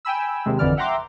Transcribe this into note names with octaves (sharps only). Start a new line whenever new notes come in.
G5 G#5 B5 E6
D#2 C3 G#3
G#1 F2 D3 E3 D5 F6
E5 F#5 G5 A#5 C6 D6